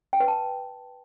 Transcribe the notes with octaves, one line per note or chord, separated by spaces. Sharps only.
G5
B4
A5